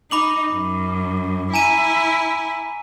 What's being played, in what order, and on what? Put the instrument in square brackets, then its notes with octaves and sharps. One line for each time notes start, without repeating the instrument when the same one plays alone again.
[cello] D#4 [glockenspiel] B5 D6 F#7
[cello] F#2
[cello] E4 [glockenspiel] G#5 A#5 D#7